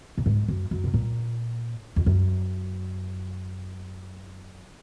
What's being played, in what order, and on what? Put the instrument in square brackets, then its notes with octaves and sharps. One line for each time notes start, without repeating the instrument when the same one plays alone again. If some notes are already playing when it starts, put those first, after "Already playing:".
[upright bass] A#2
G#2
F#2
F#2
B2
A#2
F2
F#2